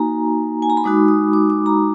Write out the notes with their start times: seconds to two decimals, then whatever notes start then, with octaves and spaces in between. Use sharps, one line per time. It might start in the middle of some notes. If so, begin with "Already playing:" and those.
Already playing: A#3 D#4 F#4 G#5 A#5
0.62 G#5
0.70 A#5
0.77 B5
0.84 G#3 D#4 F#4 D6
1.08 D#6
1.33 D6
1.50 D6
1.66 A#5